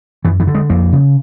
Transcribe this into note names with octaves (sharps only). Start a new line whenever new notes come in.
F#2 E3
E3
D3
G#3
F2 A#3
C#3